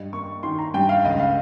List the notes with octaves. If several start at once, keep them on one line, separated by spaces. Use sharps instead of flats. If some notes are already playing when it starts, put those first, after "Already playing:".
Already playing: G2 D#5
A#3 C#6
D#3 C6
A#5
G2 G5
F5
C#2 D#5
F5